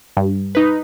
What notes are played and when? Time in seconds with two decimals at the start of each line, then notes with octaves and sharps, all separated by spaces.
0.17 G2
0.55 D#4 B4